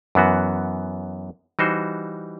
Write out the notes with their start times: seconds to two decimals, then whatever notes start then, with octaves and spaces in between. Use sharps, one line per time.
0.15 F#2 E3 B3 F#4
1.59 E3 G3 D#4 F#4 C5